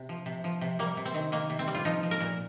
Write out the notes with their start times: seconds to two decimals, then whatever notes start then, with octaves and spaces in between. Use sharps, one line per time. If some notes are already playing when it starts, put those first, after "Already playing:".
Already playing: C3
0.09 F3
0.26 C3
0.44 F3
0.61 C3
0.79 G3 A#3
0.97 C3
1.05 C4
1.14 D#3
1.32 D#3 A#3
1.50 C3
1.59 C4
1.68 G3
1.75 F4
1.85 F3 D#4
2.03 F3
2.11 A#4
2.20 A#2